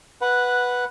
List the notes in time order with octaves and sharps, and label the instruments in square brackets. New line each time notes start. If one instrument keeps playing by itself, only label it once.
[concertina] B4 F#5